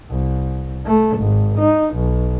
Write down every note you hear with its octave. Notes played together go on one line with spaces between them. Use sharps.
C2
A3
G#1
D#4
B1